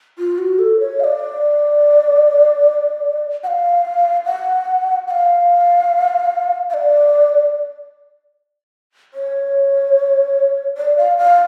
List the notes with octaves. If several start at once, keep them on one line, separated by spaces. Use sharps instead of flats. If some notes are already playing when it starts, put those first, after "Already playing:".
F4
F#4
A4
C#5
F5
D5
F#5
F5
F#5
F#5
F5
F5
D5
C#5
D5
F5
F5